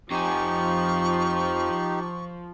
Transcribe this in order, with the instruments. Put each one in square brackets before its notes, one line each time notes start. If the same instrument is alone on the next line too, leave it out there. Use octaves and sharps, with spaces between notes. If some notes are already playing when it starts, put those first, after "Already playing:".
[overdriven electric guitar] F2 G#5 [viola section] F3 [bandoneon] D#4 G4 [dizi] C#6